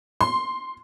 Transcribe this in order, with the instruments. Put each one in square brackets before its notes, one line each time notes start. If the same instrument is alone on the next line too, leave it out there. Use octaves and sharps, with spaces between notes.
[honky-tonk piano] C6